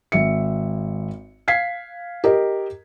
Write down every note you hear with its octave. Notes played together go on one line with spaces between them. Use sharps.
G#1 E5 C#7
F5 G#6 B6 C7
G4 A#4 D#5